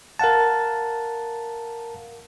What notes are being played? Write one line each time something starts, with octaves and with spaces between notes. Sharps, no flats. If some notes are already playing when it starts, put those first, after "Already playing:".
A#4 F5 F#5 A5